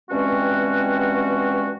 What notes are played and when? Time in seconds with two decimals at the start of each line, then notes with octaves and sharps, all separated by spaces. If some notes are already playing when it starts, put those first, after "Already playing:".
0.10 G2 E3 G#3 C4 C#4 F#4